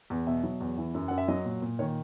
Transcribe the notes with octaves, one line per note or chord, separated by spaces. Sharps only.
E2
B2 E5
F#3
E2
E3
F#2
F#2 F#5
E5
F#3 D#5
A#2
A#2
D#3 C#5